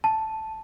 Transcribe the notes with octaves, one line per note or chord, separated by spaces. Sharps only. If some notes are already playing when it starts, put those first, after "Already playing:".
A5